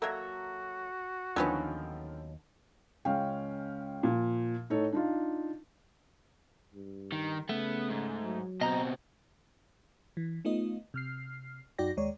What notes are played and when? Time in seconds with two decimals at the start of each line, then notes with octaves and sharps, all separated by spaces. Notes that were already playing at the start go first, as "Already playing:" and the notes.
0.02 F#3 A#3 F#4 A4 E5 A#5
1.36 D#2 D3 D#3 F3 F#3 B3 C#4
3.05 C#2 G#3 C#4 F5 G5
4.03 A#2 F3
4.70 A2 D#4 A4 C#5
4.92 D4 D#4 F4
6.74 G2
7.12 D#3
7.49 C#3 A3 B3
7.90 G#2
8.23 F#3
8.61 B2 C4 D#5 A#5
10.17 E3
10.45 A3 B3 D#4 F4 D#5
10.94 C3 F6 C7
11.78 F#2 D#4 F#4 D5 G5 A#6
11.97 D#2 G#3 C#5 D5